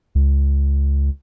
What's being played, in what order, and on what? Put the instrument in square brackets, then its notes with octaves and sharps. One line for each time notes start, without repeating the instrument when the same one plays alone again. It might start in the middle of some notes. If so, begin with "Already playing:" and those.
[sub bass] C#2